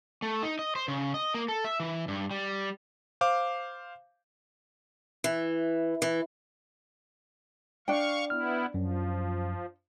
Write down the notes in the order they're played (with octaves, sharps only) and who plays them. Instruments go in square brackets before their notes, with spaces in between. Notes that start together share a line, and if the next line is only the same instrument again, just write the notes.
[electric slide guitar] A3
D#4
D#5
C5
C#3
D#5
A#3
A4
E5
E3
G2
G3
[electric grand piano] C5 F5 D6
[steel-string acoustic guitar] E3
E3
[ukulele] D4 G5 [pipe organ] F5 C#6
[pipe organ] B3 E4 [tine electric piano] F6
[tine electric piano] F#2 [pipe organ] F3